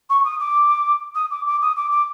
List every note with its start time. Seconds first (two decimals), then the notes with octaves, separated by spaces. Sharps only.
0.09 C#6
0.24 D#6
0.40 D6
1.15 D#6
1.30 D6
1.46 D6
1.61 D#6
1.76 D6
1.91 D6